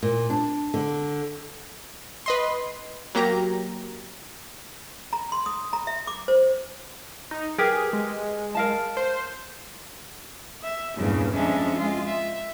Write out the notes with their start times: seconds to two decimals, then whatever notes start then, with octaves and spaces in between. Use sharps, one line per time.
0.03 A#2
0.30 D4
0.74 D3
2.26 B4 D#5 C6
3.15 F#3 A#3 G4 A#5
5.13 A#5
5.32 C6
5.46 D#6
5.73 A#5
5.87 E5
6.07 D6
6.28 C5
7.31 D#4
7.58 G4 G#4 A#4 B4
7.93 G#3
8.55 A#4 F5 A5
8.97 C5
10.62 E5
10.97 E2 G2 A#2 C#3
11.34 F2 G#3 C#4 D4 E5
11.76 G#3 F4
12.06 E5